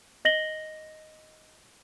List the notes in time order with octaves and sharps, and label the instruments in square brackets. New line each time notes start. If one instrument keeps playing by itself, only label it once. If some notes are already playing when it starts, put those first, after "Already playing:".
[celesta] D#5 A#6 F#7 G7